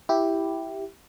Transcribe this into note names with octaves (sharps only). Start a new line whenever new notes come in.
E4 G4